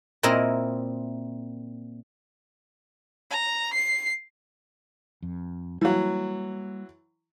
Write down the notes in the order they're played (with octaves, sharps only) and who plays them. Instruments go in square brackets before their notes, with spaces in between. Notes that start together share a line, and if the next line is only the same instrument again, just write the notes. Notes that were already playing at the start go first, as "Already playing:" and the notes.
[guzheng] A#2 C4 E4 A#4 D#5
[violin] A#5
C7
[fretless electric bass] F2
[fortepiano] E3 F#3 [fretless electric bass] G3 A#3